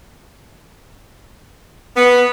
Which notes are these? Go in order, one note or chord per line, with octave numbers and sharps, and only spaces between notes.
B3